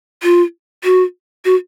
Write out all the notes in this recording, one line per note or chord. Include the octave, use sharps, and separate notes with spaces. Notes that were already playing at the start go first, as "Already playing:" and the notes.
F4
F#4
F#4